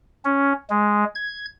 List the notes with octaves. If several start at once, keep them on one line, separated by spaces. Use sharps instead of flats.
C#4
G#3
G#6